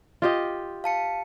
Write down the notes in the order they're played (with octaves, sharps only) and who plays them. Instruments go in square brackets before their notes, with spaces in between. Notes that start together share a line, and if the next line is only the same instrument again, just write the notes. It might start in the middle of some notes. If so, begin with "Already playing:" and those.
[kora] F4 G4 D#5
[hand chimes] F5 A5 C#7